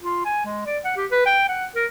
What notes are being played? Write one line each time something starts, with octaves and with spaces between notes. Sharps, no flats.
F4
G#5
G#3
D5
F#5
G4
B4
G5
F#5
A#4